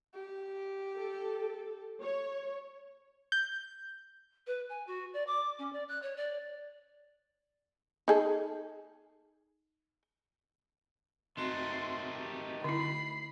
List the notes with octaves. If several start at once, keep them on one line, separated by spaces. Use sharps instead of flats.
G4
A4
C#5
G6
B4
G#5
F#4
D5
D6
C#4
D5
F#6
C#5
D5
D#4 G#4 A4
D#3 A3 C4 D#4 F#4 E5 C6
G4
D3 E4 B5 C7